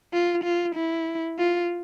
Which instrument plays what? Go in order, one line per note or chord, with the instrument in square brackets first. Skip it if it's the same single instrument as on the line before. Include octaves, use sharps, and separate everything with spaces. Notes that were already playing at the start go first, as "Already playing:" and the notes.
[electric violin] F4
F4
E4
F4